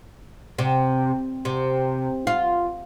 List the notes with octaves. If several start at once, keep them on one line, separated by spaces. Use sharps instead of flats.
C3
C3
F4